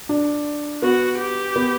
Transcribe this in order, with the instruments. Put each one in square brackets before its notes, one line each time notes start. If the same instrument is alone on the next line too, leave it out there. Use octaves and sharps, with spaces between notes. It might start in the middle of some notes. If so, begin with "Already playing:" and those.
[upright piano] D4
[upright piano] B3 [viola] F#4
[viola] G4
[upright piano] B3